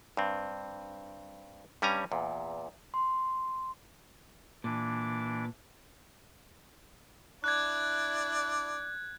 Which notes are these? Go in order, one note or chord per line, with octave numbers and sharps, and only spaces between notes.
G2 C4
G2 G3 C#4 G#5 A#5
E2 A#2
C6
A#2 E3 D4 D6
D4 E4 D5 F#6 G#6